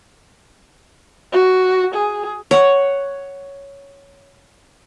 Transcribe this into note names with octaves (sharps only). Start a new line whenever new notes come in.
F#4
G#4
C#5 F#5